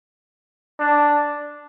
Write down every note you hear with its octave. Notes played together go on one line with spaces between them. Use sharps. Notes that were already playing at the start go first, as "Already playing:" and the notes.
D4